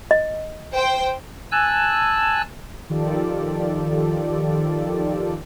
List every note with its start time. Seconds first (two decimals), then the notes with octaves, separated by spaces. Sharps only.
0.11 D#5
0.74 C5 G5
1.52 G#5 A5 E6 F#6
2.90 D#3 F3 F4 G4 A4 D5